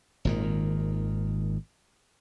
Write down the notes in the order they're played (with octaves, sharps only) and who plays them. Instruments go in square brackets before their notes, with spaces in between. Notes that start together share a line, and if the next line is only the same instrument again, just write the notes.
[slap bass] G#1 A#2 D#3